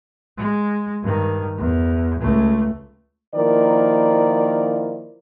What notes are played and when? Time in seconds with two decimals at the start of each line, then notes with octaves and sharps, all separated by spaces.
0.37 G#3
1.03 G2 D#3
1.58 E2
2.20 C#2 A3
3.35 D#3 F3 A#3 E4 A#4 D5